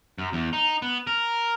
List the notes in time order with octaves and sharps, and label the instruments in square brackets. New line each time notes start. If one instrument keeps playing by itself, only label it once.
[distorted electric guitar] F#2
E2
D#4
B3
A#4